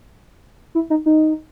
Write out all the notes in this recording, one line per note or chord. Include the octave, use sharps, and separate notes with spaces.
E4
D#4
D#4